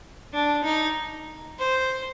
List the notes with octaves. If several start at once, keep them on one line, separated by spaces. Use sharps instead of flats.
D4
D#4
C5